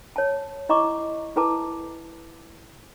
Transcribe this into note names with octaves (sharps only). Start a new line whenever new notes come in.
C#5 A5
E4 D#5 A#5 C#6 D6
E4 A4 B4 A5 A#5 D6